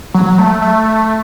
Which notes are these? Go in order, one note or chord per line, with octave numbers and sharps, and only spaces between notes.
F#3
F#3
A3
A3